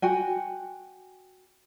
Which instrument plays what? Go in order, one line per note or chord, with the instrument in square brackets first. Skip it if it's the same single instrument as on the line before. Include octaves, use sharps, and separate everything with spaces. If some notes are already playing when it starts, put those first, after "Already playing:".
[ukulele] F#4 G5 G#5